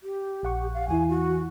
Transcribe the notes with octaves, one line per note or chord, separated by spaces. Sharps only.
G4
A#1 F#5 C#6
F5
E2 E3 E4 G#5
F#4